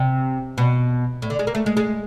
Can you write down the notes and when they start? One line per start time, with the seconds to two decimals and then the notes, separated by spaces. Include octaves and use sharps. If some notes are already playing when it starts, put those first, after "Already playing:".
Already playing: C3
0.58 B2
1.22 A2
1.30 D3
1.39 G#3
1.47 A#3
1.55 A3
1.66 G#3
1.77 G#3